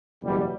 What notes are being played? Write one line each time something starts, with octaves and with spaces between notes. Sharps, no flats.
F#1 E2 B2 G3